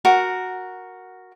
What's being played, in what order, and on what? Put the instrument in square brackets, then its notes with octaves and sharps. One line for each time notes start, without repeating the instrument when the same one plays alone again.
[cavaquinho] F#4 A#4 F#5